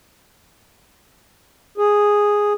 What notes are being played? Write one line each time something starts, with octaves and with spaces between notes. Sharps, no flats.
G#4